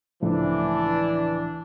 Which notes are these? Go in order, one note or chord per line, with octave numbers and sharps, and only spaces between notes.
C#2 A2 E3 F3 D4